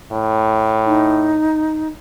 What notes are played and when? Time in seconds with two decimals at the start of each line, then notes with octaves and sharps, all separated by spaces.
0.12 A2
0.86 D#4